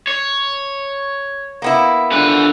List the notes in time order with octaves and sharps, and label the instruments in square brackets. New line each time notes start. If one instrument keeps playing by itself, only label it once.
[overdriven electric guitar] C#5
[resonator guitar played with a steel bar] A#3 B3 E4
[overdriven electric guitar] D3 B4